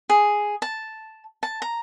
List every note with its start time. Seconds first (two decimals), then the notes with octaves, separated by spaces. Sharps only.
0.10 G#4
0.62 A5
1.43 A5
1.62 A#5